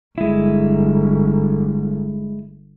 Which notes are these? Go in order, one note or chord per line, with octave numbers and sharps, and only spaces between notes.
G1 G#3 E4